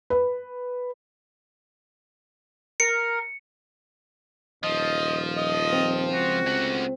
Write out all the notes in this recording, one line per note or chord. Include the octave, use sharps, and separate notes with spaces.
B4
A#4 C#7
D#1 F3 D#5
D#5
C4
C#2 F#4
A3 F#5